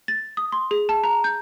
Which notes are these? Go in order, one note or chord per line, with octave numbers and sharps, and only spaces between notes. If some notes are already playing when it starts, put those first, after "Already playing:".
A6
D#6
C6
G#4
A5
A#5
G6